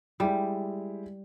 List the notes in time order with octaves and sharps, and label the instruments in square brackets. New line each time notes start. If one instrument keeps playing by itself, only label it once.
[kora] G3 [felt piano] G#3 E4 G4